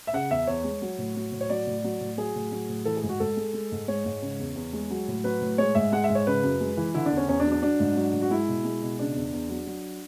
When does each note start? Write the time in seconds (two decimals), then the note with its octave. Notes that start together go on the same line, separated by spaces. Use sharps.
0.07 E5
0.13 C#3 F#5
0.31 E2 E5
0.47 E2 C#5
0.64 G#3
0.82 F#3
0.98 A2
1.16 F#3
1.32 A2
1.41 C#5
1.50 F#3 D5
1.67 A2
1.84 F#3
2.01 A2
2.17 F#3 G#4
2.35 A2
2.52 F#3
2.69 A2
2.85 E3 A4
2.97 G#4
3.03 G#2
3.09 F#4
3.20 G#2 A4
3.37 G#3
3.54 G#3
3.72 G#2
3.88 G#3 C#5
4.05 G#2
4.22 C#3
4.39 E2
4.56 E2
4.73 G#3
4.90 F#3
5.08 A2
5.24 F#3 B4
5.41 A2
5.58 G#3 C#5
5.75 G#2 E5
5.92 G#3 F#5
6.04 E5
6.09 G#2
6.15 C#5
6.27 C#3 B4
6.44 F#2
6.61 G#3
6.77 E3
6.94 D3 E4
7.06 D4
7.11 E2
7.17 C#4
7.28 E2 C#4
7.40 D4
7.46 F#3
7.52 D4
7.63 F#3 D4
7.80 G#2
7.96 F#3
8.14 G#2
8.22 F#4
8.30 G#3 E4
8.48 B2
8.65 G#3
8.82 B2
8.99 C#3 D4
9.15 E2
9.33 E2
9.49 F#3
9.67 F#3